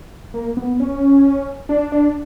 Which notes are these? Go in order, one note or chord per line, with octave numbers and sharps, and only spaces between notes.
A#3
B3
C#4
D4
D4